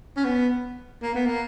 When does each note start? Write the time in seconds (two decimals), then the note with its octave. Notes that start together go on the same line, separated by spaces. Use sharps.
0.16 C#4
0.24 B3
1.02 A#3
1.15 B3
1.26 A#3